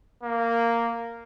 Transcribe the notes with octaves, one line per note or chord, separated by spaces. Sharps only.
A#3